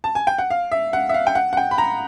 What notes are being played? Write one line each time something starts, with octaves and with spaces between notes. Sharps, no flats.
A5
G#5
G5
F#5
F5
E5
F#5
E5
F5
G5
F#5
F#5
G5
B5
A#5